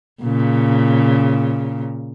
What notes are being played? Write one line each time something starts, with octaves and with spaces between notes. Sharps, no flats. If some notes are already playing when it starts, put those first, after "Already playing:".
A#2 C#3